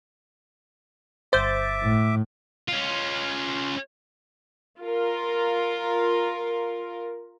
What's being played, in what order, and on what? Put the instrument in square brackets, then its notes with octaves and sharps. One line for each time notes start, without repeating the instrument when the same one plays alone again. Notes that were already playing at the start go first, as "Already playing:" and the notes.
[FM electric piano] G1 A6 [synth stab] C5 G6 [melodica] E5 D6
[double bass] A2
[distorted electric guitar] C#4 F4
[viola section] F4 A#4